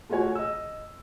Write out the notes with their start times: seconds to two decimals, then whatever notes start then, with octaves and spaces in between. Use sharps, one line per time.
0.09 A3 F4 F#4 G#4 C#5 G#5
0.35 D#5 E6